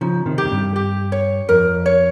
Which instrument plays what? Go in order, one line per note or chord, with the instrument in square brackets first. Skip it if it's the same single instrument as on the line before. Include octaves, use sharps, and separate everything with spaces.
[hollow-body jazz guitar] C#3 F3 [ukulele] D#4
[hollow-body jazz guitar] C3 D#3
[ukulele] G4
[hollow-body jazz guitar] F2
G2
[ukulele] G4
C#5
[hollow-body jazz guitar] F2 [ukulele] A#4
[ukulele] C#5